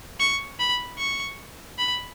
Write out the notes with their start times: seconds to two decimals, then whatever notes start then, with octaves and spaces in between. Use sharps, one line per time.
0.20 C#6
0.59 B5
0.98 C#6
1.78 B5